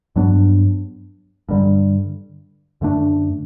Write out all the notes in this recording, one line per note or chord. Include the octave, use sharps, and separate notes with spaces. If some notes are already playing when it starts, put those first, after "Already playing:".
G2 F#3 B3 D4
G2 D3 G3
F#2 D3 A3 D4